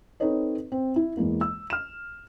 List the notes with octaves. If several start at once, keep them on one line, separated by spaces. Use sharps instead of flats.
C4 D#4 A4 B4 C#5 D#5
C4
E4
E2 E3 G#3 A#3
E6
F6 E7